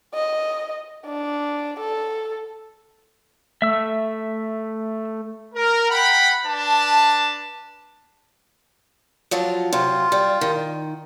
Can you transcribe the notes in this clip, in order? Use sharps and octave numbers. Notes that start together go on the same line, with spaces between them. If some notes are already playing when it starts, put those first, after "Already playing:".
D#5
D4
A4
A3 E5 E6
A#4
F#5 G5 B5
D4 B4 A5
F3 F#3 F4
C3 F#3 F4
G3
D#3